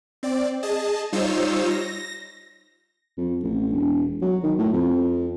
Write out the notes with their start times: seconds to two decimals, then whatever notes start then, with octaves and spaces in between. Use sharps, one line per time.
0.23 C4 D5
0.63 G#4 D#5 A5
1.13 G3 D#4 F4 C5 C#5 E6
1.70 A#6
3.17 F2
3.43 A1
3.72 E1
4.22 F#3
4.43 D#3
4.58 A2
4.73 F2